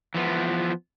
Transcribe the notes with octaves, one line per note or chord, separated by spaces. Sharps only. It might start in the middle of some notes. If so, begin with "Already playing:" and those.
E3 F3 B3